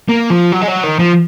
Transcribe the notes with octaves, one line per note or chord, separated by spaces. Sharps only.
A#3
F3
F#3
G#3
F#3
D#3
F3